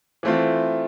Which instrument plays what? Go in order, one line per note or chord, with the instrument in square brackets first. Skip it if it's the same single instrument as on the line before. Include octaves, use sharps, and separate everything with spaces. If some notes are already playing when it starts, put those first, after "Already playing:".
[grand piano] E3 A3 C4 F4